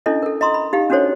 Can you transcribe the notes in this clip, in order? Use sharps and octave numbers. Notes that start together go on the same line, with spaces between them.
C#4 D4 E4 A4 D#5
A4 A#4
D#5 A#5 C6 D#6
B5
D#4 G4 F5
C#4 D4 F#4 A4 C5 C#5